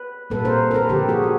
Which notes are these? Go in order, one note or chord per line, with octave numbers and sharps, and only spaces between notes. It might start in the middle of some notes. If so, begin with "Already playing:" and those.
Already playing: B4
A#2 G3 A#3 A4 B4
A#4 C5
A#4
A4 B4
D3 F3 A#3 G4 A4
F#4 G#4
F#4